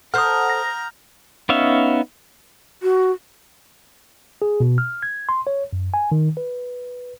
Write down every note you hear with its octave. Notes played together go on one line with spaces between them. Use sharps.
A4 C5 F#5 A#5 D#6 F6 G6
A#6
B3 C#4 D#4 E5 F5
F#4
G#4
B2
F6
G#6
C6
C#5
F#2
G#5
D#3
B4